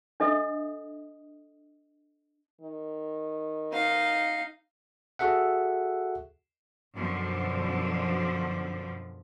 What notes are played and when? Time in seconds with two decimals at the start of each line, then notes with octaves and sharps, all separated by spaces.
0.20 D4 A4 D#5 E5 D#6
2.61 D#3
3.73 D#4 F5
5.19 F#4 G#4 A4 E5 F#5
6.96 F#2 B2 D3 F3